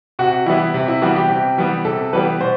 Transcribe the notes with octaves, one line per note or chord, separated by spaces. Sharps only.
C3 F#4
E3 G3 B3 E4
C3
E4
E3 G3 B3 F#4
G4
C3
E3 G3 B3
C3 A4
E3 G3 B3 B4
B2 C5